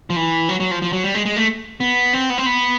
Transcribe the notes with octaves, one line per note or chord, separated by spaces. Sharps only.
F3
E3
F#3
F#3
F3
F3
F#3
G3
G#3
G#3
A3
B3
C4
B3
C4
B3